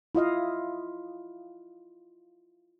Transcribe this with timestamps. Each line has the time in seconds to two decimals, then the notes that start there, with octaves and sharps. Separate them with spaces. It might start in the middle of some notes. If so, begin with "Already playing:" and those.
0.15 E4 F4 D#5 F5